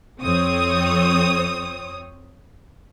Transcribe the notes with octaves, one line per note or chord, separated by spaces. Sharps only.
F2 C4 C#5 D#6